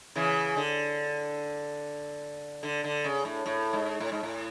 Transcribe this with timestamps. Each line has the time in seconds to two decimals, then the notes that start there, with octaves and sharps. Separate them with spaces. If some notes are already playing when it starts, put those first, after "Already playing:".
0.15 C#3 E3
0.57 D3
2.63 D3
2.84 D3
3.04 C#3
3.25 A2
3.46 A2
3.73 G#2
4.00 A2
4.12 G#2
4.23 A2